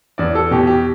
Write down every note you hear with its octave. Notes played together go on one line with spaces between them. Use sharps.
E2 D5
A4
B2 G4
G4